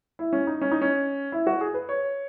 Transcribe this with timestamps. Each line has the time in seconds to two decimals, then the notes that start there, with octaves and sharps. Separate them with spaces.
0.19 E4
0.33 C#4
0.47 D#4
0.61 C#4
0.72 D#4
0.81 C#4
1.32 E4
1.47 F#4
1.61 G#4
1.74 B4
1.89 C#5